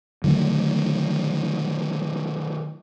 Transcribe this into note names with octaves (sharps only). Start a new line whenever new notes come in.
D3 D#3 F#3 A3